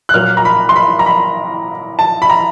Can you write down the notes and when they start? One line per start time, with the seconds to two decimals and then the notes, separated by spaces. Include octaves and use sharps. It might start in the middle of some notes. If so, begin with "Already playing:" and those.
0.09 F#6
0.14 A#2 F#3 A#3 F6
0.37 A#5
0.45 B5
0.69 C6
0.76 B5
0.99 A#5
1.06 B5
1.99 A5
2.22 B5
2.30 A#5